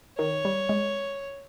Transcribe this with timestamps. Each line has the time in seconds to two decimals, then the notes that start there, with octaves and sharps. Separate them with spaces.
0.19 D#3 C#5
0.45 G3
0.69 G#3